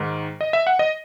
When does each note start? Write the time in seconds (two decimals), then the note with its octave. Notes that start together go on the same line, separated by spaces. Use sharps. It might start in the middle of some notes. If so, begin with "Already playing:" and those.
Already playing: G#2 D#3
0.41 D#5
0.53 E5
0.67 F#5
0.79 D#5